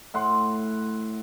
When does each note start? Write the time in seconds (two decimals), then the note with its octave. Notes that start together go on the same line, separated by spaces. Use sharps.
0.14 A2 F#5 C6